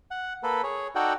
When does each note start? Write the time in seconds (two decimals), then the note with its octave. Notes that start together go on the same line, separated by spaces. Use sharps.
0.11 F#5
0.43 A#3 A4 B4
0.63 G#4 C#5
0.95 D#4 F#4 A4 D5 F#5 G5